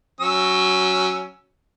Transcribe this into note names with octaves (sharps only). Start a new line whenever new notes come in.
F#3 C#4 E6